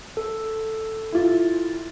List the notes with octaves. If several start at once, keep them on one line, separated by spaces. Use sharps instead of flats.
A4
E4 F4